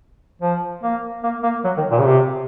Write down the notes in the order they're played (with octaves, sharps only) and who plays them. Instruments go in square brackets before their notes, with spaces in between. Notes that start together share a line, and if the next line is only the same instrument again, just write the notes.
[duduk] F3
A#3
A#3
A#3
F#3
D#3
A#2
C#3
C3